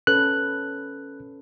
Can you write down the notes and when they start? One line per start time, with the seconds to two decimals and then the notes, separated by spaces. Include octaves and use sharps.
0.07 C#4 A4 B4 F#6